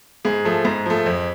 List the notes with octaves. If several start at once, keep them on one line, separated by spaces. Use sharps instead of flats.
G#2 G#4
F3 A3
G#2
F3 A3
F2